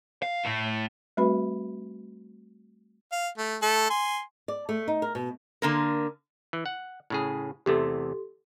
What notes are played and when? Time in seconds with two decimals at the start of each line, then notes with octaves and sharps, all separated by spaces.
0.22 F5
0.45 A2
1.17 G3 A3 C4 F#4 B4 B5
3.12 F5
3.38 A3
3.62 A3 A4
3.90 G#5 C6
4.48 D5
4.69 A3
4.88 D#4
5.02 A#4
5.15 B2
5.62 D3 A#3 A#4
6.53 E3
6.66 F#5
7.10 A2 C#3 G#4
7.66 E2 C3 A3 G4 A4 C6